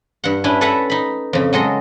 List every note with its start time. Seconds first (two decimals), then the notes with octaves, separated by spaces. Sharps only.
0.24 G2 F#5
0.44 C#4 D4 E4 B4
0.61 A4 B4 E5 F#5 A5 A#5
0.90 D#4 B5
1.33 F2 C#3
1.53 F#3 G#3 A4 D#5